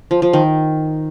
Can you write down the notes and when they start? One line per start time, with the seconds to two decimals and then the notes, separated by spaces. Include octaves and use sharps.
0.11 F3
0.22 F3
0.33 D#3